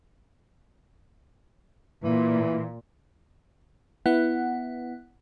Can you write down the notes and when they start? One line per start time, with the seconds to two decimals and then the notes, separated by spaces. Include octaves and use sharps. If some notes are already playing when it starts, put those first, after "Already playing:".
2.04 A#2 E3
4.06 B3 E4 F#5